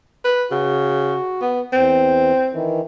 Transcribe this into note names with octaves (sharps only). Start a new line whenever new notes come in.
B4
C#3 F#4
B3
E2 C4
D#3 E3